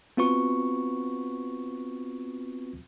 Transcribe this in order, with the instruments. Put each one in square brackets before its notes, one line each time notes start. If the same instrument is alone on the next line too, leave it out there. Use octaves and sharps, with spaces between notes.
[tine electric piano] B3 C4 F4 F#4 B4 C#6